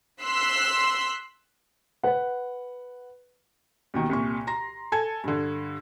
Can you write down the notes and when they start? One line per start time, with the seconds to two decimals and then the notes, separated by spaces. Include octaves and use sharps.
0.22 C6 E6 F#6 B6 C7
2.03 B4 F#5
3.94 D#2 B2 D#3
4.10 C2 A#2 C#6
4.47 A#5 C6 A#6
4.92 A4 G#5 A5 G#6
5.24 G2 D3